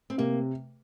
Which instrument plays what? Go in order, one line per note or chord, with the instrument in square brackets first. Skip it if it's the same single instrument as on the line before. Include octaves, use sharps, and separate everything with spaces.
[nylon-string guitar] C4
[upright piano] C3 [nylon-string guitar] A#3